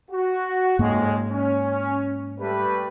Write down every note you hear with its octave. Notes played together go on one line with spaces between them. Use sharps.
F#4
F2 G#2 C#3 G#3 A#3
C#4
G3 A3 B4